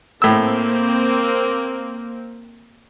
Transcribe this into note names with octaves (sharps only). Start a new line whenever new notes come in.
A2 A#3 C4 E6